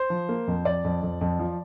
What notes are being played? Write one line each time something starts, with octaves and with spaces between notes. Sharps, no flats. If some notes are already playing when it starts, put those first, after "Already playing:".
Already playing: C5
F3
A#3
F2
F2 D5
F2
F2
F2
F3